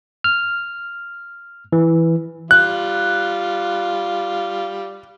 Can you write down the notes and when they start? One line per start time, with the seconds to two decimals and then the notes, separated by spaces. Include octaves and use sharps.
0.24 F6
1.72 E3
2.51 G3 F4 F#6